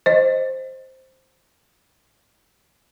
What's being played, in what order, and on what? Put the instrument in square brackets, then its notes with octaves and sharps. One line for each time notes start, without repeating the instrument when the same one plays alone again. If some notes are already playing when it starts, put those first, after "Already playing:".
[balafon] C5 D#5